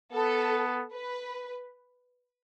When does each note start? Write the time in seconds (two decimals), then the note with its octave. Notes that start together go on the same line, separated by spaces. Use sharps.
0.13 B3 A4
0.93 B4